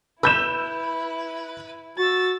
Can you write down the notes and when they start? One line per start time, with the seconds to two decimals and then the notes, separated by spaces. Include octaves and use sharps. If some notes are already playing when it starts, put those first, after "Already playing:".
0.23 E4 B4 E6 G6 E7
1.98 F#4 E6 A6